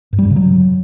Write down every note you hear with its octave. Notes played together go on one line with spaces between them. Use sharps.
G2
G3
F#2
C#3
F#3